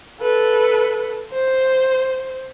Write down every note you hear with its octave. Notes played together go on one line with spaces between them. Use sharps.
A4 B4
C5